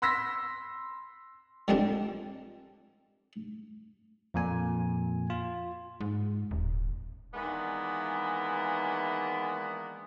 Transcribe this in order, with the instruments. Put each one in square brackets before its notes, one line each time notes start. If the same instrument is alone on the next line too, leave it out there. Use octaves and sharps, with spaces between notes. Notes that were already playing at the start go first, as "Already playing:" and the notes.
[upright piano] B5 C6 E6 A#6 B6
[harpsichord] D3 D#3 F3 G3 C4 D4
[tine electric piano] F2 A#2 G#5
F4
[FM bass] G#2
D#1
[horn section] D#3 E3 G#3 A#3 B3 D4